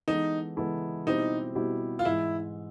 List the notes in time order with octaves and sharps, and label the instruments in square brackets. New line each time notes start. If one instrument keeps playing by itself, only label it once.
[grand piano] E3 G#3 B3 E4 A4 [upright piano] D#4
[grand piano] E3 G#3 B3 E4 A4
[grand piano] B2 G3 C4 E4 G4 [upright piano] D#4
[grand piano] B2 G3 C4 E4 G4
[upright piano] F4
[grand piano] G#2 E3 G#3 [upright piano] E4